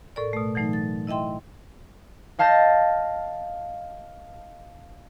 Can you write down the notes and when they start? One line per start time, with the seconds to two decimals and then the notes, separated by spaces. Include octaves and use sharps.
0.16 A2 A4 A#4 D5
0.33 B2 A3
0.55 E3 F#3 A3 D#4
0.73 A6
1.07 E4 D#5 E5 G5 C6
2.39 D#5 F5 A5 G6 A6 A#6